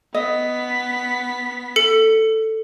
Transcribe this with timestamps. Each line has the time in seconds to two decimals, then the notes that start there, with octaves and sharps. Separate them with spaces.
0.14 B3 D#5 B6
1.76 A4 C#7